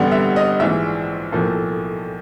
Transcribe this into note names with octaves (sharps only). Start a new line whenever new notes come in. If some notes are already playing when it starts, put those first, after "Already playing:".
Already playing: A1 G2 D3 G3 B3 F#5
E5
D#5
A#1 G#2 E3 E5
B1 A2 F3 A#3